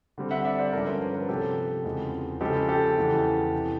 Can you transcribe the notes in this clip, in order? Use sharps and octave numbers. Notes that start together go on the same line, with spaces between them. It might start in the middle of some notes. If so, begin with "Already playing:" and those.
D3 G3 C4
E5 F#5
D5 E5
C5 D5
G2 D3 F3 G#3 C#4 A#4 C5
B4 C#5
A#4 C5
A4 B4
C3 F3 A3 G4 A4
E2 C#3 F3 G#3 C4
C#3 F3 G#3 G4 A4
G4 A4
E2 C#3 E3 A3
C3 E3